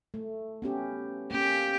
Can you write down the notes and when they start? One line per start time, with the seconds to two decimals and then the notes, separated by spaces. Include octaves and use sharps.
0.14 A3
0.62 B3 C#4 G4
1.31 A#3 C#4 G4